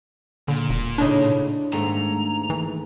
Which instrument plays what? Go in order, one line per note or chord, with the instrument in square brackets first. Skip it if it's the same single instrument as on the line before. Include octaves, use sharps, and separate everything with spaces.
[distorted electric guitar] A#2 [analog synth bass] D3
[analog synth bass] E1
[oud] A2 C#3 D#4 [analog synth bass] D4
[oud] D#2 G#2 A3 [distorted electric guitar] A#5
[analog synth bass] E3